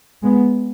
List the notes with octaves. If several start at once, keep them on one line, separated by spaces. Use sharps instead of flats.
G#3 B3